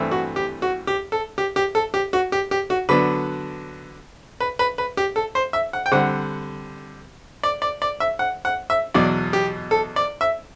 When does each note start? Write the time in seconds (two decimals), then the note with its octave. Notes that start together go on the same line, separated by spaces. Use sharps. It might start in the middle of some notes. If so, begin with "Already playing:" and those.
Already playing: G2 E3 A3 C4
0.11 F#4
0.36 G4
0.62 F#4
0.87 G4
1.12 A4
1.38 G4
1.56 G4
1.75 A4
1.94 G4
2.13 F#4
2.32 G4
2.51 G4
2.70 F#4
2.89 D3 F#3 B3 D4 B4
4.40 B4
4.59 B4
4.78 B4
4.97 G4
5.16 A4
5.35 C5
5.53 E5
5.73 F#5
5.86 G5
5.92 D3 G3 C4 F#5
7.43 D5
7.62 D5
7.82 D5
8.00 E5
8.19 F#5
8.45 F#5
8.70 E5
8.94 E2 B2 F#3 D5
9.33 G4
9.71 A4
9.96 D5
10.21 E5